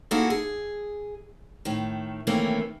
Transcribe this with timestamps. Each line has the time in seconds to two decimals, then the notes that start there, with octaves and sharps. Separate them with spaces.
0.11 A#3 D#4 E4 F#4 G#4 A4
0.30 G#4
1.65 A2 D#3
2.27 C3 D#3 E3 A3 A#3 C#4